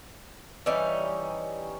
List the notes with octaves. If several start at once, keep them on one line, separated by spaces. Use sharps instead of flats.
E3 G3 C#4 D#4